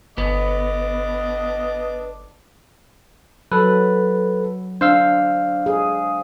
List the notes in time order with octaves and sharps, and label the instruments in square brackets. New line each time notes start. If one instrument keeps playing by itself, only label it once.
[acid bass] G1 [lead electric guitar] B3 [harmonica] D4 D#5 D6
[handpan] F#3 [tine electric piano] A4 B4
[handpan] D4 [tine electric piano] C5 F5 E6
[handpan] G#4